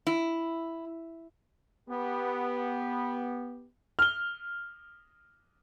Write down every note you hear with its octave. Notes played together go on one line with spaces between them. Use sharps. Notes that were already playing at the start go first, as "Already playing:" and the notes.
E4
B3 G4
F6 G7